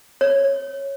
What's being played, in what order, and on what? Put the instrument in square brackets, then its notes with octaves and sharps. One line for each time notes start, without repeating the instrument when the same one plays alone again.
[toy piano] C#5